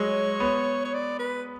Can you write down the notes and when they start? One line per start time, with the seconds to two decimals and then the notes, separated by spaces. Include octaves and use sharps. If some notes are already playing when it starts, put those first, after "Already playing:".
Already playing: F#3 G#3 C#5
0.40 B3
0.85 C#5
0.94 D5
1.19 B4